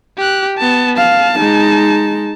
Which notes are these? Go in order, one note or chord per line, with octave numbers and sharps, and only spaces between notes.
G4 F#6
B3 A5
F5 A5
G#3 D#4